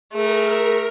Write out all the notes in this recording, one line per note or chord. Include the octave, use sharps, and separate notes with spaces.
A3 G#4 A#4